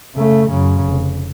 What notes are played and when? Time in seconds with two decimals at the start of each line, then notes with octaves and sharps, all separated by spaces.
0.16 C#3 A3
0.50 F#2 C#3
0.89 F1